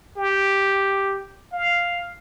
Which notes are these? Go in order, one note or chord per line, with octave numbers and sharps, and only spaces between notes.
G4
F5